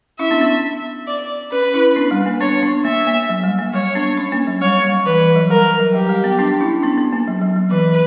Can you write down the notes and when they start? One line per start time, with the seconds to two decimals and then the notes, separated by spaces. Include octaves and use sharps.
0.19 C#4 E4 E5
0.31 B3 D4
0.41 B3
1.08 D5
1.52 C#4 B4
1.74 C#4 E4
1.96 B3 D4
2.11 G3
2.26 A#3
2.40 B3 D4 C#5
2.63 B3 D4
2.85 A#3 E5
3.07 A#3
3.29 F#3
3.44 G3
3.59 A#3
3.74 G3 C#5
3.95 B3 D4
4.17 C#4
4.32 A#3
4.47 F#3
4.62 G3 C#5
4.84 G3
5.06 E3 B4
5.21 E3
5.36 F#3
5.51 G3 A#4
5.80 F#3
5.94 F#3 G4
6.09 G3
6.24 B3
6.39 B3 D4
6.61 C#4 E4
6.83 B3 D4
6.98 B3
7.13 A#3
7.28 F#3
7.41 F#3
7.56 F#3
7.71 E3 B4